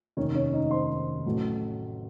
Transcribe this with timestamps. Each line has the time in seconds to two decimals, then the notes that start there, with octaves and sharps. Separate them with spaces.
0.17 F1 D#2 D#3 C#4 C#5
0.35 C#4 C#5
0.53 D#4 D#5
0.71 C5 C6
1.26 A1 A2 F#3 A3